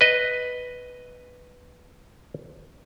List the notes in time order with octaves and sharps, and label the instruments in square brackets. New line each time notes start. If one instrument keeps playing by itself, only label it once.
[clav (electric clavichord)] B4 D#5